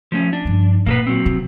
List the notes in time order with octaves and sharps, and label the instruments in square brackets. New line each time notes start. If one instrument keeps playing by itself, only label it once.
[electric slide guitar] F3 A3 C#4
D4
[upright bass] G2 F3
[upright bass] A#2 [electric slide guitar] A#3 A4 B4
[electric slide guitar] F#3 C4
[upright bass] C3